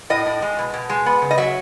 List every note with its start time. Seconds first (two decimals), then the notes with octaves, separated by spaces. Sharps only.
0.10 A2 D#5
0.26 A2
0.42 G#3
0.59 B2
0.74 B2
0.89 G#3
1.06 B3
1.22 C#3
1.31 D#5
1.38 F#3 E5